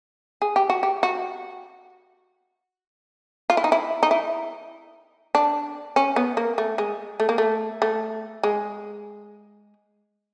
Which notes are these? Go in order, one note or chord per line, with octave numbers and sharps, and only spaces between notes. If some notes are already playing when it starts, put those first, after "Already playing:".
G#4
G4
F#4
G4
F#4
F4
E4
D#4
E4
D#4
E4
D4
C#4
B3
A#3
A3
G#3
A3
A#3
A3
A3
G#3